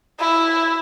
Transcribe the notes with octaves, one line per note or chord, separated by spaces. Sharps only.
E4